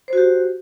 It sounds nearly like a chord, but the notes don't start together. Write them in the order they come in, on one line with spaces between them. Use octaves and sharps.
C5 F#4 G4